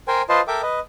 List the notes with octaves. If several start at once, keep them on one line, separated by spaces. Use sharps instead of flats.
A#4 C5 G5 G#5
F4 B4 C5 D#5 A5 C6
A4 A#4 E5 G5 D6
B4 D#5